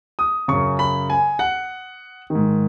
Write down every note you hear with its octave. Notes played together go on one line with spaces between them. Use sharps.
D#6
F#2 C#3 C#6
B5
G#5
F#5
D#3
G#2